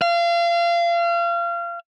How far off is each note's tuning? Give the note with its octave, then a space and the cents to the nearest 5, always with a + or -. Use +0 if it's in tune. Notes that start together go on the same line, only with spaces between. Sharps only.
F5 -30